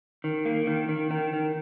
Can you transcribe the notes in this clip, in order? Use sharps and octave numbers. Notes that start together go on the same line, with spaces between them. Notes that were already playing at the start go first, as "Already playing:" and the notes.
D#3
A#3
D#3
D#3
D#3
D#3